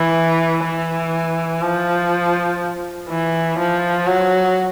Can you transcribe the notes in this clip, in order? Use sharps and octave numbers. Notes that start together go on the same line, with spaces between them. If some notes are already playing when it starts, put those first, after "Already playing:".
Already playing: E3
E3
F3
E3
F3
F#3